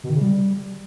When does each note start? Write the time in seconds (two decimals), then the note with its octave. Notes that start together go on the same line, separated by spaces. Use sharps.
0.04 B2
0.10 D#3
0.15 C#3
0.21 G3